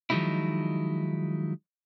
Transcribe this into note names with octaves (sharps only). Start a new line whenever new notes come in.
D#3 F3 F#3 G#3 D#4 E4